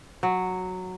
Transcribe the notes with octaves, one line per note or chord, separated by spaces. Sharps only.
F#3